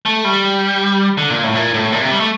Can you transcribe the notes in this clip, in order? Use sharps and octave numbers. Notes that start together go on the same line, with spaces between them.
A3
G3
D3
A#2
A2
A#2
A2
A#2
C3
G3
A3